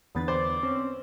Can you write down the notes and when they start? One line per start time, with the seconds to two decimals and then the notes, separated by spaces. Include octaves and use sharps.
0.15 E2 D3 B3 B4 A6
0.28 C5 D5
0.63 C4 C#4